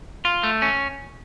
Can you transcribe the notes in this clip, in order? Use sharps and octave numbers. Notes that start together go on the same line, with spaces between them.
F4
A3
C#4